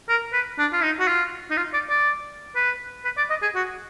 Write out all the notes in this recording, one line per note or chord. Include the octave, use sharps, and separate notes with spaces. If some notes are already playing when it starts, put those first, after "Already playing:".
A#4
B4
D4
F4
D#4
F#4
F4
D#4
F4
D5
D5
B4
B4
D5
D#5
G#4
F#4